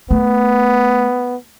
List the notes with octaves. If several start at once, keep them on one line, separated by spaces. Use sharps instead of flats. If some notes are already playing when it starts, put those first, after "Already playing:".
A3 B3